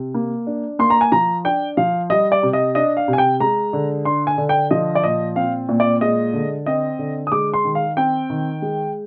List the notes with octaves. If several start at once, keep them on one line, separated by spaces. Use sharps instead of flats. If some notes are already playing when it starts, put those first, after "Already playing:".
Already playing: C3
A#3
D4
A#3 C6
A#5
G#5
F3 A#5
D4 G5
F3 F5
G3 D#5
D5
C3
D#5
D4 D#5
F5
C3
G#5
G5
G#3 A#5
D3
D4 C6
G#5
D3
G5
F3 D#5
D5
A#2 D#5
C4 F5
A#2
D5
G#3 D#5
D3
C4 D#5
D3
D#6
G#3 D6
C6
D#3
F5
C4 G5
D#3
G#3